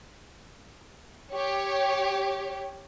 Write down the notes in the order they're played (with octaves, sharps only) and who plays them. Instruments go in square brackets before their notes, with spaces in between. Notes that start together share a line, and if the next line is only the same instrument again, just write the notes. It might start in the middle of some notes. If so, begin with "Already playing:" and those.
[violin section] G4 C#5